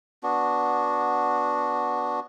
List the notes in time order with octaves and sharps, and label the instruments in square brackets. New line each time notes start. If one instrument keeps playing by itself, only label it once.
[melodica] B3 D4 F#4